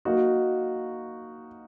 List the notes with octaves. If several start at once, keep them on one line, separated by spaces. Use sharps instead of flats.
A#3 D#4 F#4